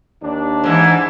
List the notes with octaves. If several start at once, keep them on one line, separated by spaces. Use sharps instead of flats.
D#2 D4
G#2 E3